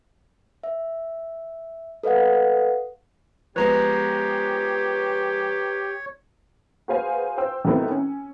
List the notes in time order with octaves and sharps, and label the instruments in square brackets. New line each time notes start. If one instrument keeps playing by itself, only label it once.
[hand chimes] E5
A4 B4 D#5 F5 F#5
[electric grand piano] F3 G#3 B3 [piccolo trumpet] G4 [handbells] B4 A#5 [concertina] C#5
[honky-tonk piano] F#4 G#4 B4 C5 F5 G#5
C5 G5 E6
D#3 F#3 A3 B3 C4 E4
C#4